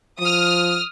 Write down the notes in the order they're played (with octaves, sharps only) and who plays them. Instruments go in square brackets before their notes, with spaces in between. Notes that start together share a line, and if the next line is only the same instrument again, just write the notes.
[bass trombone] F3 [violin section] D#6 F6